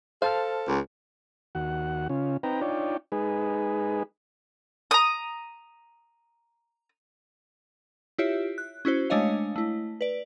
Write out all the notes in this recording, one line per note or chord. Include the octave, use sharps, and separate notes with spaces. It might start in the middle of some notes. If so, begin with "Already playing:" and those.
A4 C5 F5 A5 F6
C#2
D#2 F#4 F#5
C#3 C#4 F4
C4 D#4 B4 G5 A#5
D4 D#4 F4 C#5 D5 G5
G#3 D#4 G#4 B4
A#5 D#6
E4 F4 G4 C#5 E5
F#6
C#4 E4 F#4 C5
G#3 A3 D4 C#5 D#5 F5
A3 E4
B4 D5